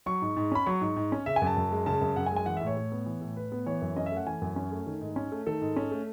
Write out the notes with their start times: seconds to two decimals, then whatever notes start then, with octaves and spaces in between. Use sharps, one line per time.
0.06 F#3 C#6
0.22 G#2
0.36 G#2
0.52 C#4 B5
0.66 F#3 C#6
0.81 G#2
0.96 G#2
1.12 C#4
1.26 C#3 E5
1.36 G#5
1.42 F#2 A5
1.56 F#2
1.71 G#3
1.86 C#3 A5
2.01 F#2
2.16 F#2 F#5
2.26 G#5
2.31 G#3
2.36 G#5
2.46 E3 F#5
2.57 E5
2.61 A2
2.67 C#5
2.77 A2
2.92 B3
3.06 E3
3.21 A2
3.37 A2 B4
3.52 B3
3.66 E3 C#5
3.82 F#2
3.96 C#4 D#5
4.06 E5
4.12 A3
4.17 F#5
4.27 E3 G#5
4.42 F#2
4.56 C#4
4.71 A3
4.86 D#3
5.01 G#2
5.16 C#4
5.32 A3
5.47 D#3 A4
5.61 G#2
5.76 C#4
5.91 A3